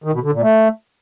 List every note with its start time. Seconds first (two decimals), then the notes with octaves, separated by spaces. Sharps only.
0.04 D#3
0.14 B2
0.23 D3
0.33 A#2
0.42 A3